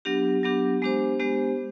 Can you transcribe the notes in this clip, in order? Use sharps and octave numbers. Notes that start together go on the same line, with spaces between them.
F#3 B3 D4 G4
F#3 B3 D4 G4
G#3 B3 D4 G4 C5
G#3 B3 D4 G4 C5